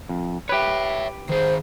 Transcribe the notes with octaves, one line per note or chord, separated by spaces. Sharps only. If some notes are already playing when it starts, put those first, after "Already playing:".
F2
G4 B4 C#5 E5
D#3 G#4 C5